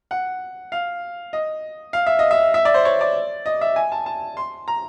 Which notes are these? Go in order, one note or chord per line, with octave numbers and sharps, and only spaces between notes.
F#5
F5
D#5
F5
E5
D#5
E5
E5
D5
C5
C#5
D5
D#5
E5
G#5
A5
A5
C6
A#5